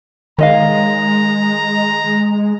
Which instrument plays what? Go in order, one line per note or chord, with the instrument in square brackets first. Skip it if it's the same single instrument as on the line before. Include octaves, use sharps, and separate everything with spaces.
[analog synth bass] D#3 [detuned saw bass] G#3 [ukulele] C#5 D#5 F5 [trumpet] A#5